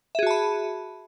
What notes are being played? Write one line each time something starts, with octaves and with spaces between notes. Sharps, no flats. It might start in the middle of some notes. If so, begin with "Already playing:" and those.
F#4 G#4 E5 A5 B5